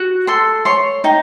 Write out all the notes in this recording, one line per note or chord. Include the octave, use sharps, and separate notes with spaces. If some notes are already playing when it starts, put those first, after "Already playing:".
Already playing: F#4
A4 C6
C#5 C6
D#4 G5